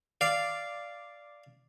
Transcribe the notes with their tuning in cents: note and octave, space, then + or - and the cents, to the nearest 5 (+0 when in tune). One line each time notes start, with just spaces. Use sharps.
D5 +0 F5 -10